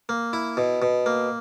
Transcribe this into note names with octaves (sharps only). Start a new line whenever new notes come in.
A#3
E4
B2
B2
A#3